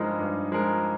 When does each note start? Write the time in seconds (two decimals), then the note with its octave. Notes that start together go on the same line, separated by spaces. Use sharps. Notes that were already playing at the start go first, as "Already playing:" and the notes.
Already playing: G2 F3 G#3 D#4 A#4
0.19 G2
0.52 F3 G#3 D#4 A#4